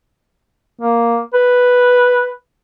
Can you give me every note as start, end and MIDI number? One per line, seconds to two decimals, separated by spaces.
0.81 1.19 58
1.34 2.32 71